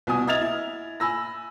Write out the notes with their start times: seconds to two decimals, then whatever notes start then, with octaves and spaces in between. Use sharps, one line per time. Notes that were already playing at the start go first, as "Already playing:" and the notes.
0.07 C2 B2 G#5 D#6
0.27 D#5 E5 F6 G#6 A6 F7
0.41 E4
1.00 G#5 B5 E6 A#6